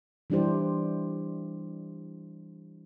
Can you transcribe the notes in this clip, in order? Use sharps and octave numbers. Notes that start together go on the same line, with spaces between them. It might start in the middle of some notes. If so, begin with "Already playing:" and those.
E3 G3 D4 E4 G4 C5